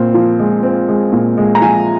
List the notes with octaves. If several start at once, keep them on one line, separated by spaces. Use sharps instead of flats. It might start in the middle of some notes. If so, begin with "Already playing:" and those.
Already playing: A#2 C4
F3
G#3
C4
G#3
A#2
G#3
A#5
F3 G#5